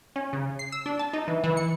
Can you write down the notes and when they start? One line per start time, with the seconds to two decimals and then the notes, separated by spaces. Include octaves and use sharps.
0.16 C#4
0.33 C#3
0.59 C7
0.72 E6
0.86 D4
0.99 A5
1.13 D#4
1.28 E3
1.44 E3
1.57 C#7